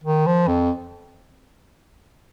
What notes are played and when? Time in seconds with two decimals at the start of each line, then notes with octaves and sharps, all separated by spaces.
0.04 D#3
0.26 F3
0.48 F2